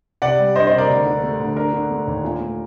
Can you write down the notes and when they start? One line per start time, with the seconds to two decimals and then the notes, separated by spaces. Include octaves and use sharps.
0.22 C3 D5 F#5
0.39 G3
0.55 D4 C5 D#5
0.67 C5 D#5
0.72 C3
0.78 A#4 D5
0.90 D2
1.06 D3
1.23 A3
1.40 D2
1.56 D4 A#4
1.73 D3
1.90 A3
2.07 D#2
2.24 A#2
2.40 A3